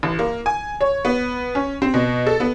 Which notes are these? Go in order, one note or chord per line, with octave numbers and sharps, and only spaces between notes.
A1
A#3
G#5
C#5
B3
C#4
C4
B2
A4
B3